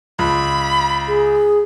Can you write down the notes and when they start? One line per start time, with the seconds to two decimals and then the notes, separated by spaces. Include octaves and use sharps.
0.19 C#2 B5
1.08 G#4